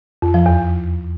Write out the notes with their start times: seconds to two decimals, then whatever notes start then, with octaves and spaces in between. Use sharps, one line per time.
0.22 F2
0.34 F3
0.46 E2